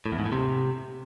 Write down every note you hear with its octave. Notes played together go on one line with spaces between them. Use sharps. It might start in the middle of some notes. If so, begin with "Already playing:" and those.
A2
E2
G#2
A2
C3